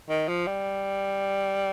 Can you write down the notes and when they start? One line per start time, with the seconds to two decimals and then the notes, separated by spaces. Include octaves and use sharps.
0.09 D#3
0.28 F3
0.47 G3